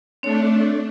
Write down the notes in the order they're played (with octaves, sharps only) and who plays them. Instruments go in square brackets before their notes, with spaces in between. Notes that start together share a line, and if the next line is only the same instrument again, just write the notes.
[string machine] A3 D4 [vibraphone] C4 C#5